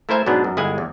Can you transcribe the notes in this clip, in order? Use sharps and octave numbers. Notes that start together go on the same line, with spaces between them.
A3 E4 A#4 C5 E5 G#5
G#2 B2 F#3 B3 D4 G#4
F#2
G1 G#3 E4 G#4 F#5 G#5
E2